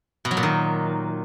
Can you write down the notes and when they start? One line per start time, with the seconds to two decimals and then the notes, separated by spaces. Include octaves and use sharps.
0.25 B2
0.31 F#3
0.37 A#2
0.43 D#3